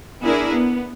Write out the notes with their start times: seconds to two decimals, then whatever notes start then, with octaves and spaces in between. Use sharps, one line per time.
0.22 B3 D4 E4 G#4 A#4
0.51 B3